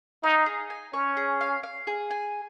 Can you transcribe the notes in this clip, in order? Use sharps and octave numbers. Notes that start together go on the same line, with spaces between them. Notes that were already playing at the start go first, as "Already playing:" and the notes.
D#4 F5
G#4
G#5
C#4 C#5
G#4
F5
F5
G#4
G#5